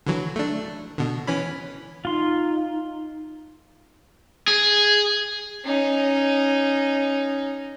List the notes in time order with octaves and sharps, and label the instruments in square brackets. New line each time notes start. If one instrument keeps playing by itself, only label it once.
[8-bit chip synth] D3 E3 F#3
A3 D4
B2 D3
E3 C#4 B5
[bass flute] D#4 [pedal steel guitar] F4 C6
[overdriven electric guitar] G#4
[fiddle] C#4 D#4